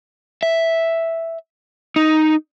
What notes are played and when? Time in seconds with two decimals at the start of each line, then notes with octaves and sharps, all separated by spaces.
0.43 E5
1.96 D#4